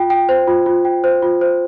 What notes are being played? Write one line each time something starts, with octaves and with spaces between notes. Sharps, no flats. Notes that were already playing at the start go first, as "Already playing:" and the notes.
Already playing: F4 G5
G5
C5
F4
F4
G5
C5
F4
C5